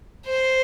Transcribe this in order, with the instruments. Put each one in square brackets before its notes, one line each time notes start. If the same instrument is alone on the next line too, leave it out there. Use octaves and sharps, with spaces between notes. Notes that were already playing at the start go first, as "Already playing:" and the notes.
[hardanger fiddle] C5